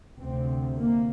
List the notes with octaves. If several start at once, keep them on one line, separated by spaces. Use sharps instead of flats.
D2 C3 C4
A#3